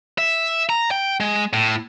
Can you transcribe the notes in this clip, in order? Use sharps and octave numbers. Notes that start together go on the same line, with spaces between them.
E5
A#5
G5
G#3
A2